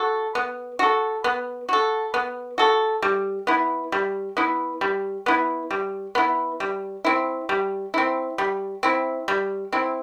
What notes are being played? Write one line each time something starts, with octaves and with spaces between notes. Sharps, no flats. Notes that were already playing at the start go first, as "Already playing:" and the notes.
Already playing: F#4 A4
B3
F#4 A4
B3
F#4 A4
B3
F#4 A4
G3
B3 E4
G3
B3 E4
G3
B3 E4
G3
B3 E4
G3
C4 E4
G3
C4 E4
G3
C4 E4
G3
C4 E4